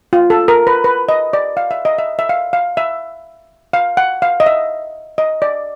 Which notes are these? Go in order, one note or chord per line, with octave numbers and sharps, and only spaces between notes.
F4
A4
A#4
B4
B4
D#5
D5
F5
E5
D#5
E5
E5
F5
F5
E5
F5
F#5
F5
D#5
E5
D#5
D5